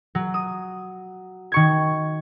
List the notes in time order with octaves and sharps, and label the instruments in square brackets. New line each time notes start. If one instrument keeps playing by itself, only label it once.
[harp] F#3
D#6
D#3 C#6 G#6